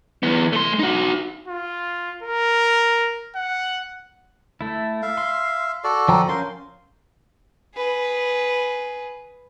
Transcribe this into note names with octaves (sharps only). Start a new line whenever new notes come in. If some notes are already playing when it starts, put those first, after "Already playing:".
E3 B3
A3 C6
D#4 F#4
F4
A#4
F#5
A3 E4
E5 F5
C6
F#4 A4 D5
F3 G5 A#5
C#4 A#4 F5 C6 G6
G#4 B4